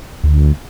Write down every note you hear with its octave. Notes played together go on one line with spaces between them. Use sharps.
D2